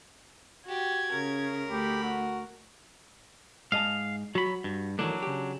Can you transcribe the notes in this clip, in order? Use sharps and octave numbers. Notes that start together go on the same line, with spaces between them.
F#4 G4 G#6
C#3 A#4
D2 G4 B5
F#4
G#2 D#5 F5 A5
F#3 F#4 B5
G2
D#3 E3 F#3 A3 D4
C#3 G4